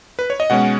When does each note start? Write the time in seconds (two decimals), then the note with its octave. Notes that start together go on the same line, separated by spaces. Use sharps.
0.19 B4
0.30 C#5
0.40 D#5
0.50 B2 G#3 C#4 F#5